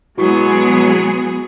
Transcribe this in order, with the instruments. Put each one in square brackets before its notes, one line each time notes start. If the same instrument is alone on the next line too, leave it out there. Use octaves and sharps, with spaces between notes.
[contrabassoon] B2 [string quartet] F#3 G#4 [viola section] G#3 B3 [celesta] E4 F#4 C#6